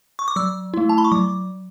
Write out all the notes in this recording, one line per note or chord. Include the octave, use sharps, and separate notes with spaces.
C#6
D6
F#3 E6
A3 E4
A5
B5
C#6
F#3 D6